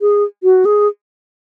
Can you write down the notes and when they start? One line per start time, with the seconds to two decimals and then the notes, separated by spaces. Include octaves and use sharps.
0.01 G#4
0.43 F#4
0.65 G#4